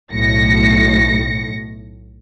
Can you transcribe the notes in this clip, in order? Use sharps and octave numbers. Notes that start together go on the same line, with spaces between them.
B1 A2 A#6 C#7